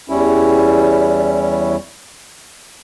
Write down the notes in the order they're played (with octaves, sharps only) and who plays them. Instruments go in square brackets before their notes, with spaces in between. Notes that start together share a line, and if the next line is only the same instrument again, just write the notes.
[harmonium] E2 G3 C#4 E4